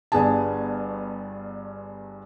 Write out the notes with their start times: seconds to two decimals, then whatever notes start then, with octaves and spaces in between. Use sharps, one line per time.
0.12 G1 G2 B3 G#4 G#5 A5